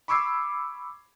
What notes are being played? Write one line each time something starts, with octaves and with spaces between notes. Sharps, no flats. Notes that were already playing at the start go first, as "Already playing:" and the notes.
B5 C#6 D6 E6 G#6 C7